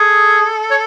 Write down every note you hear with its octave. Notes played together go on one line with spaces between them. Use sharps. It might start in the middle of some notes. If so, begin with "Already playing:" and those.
Already playing: G#4 A4
C#5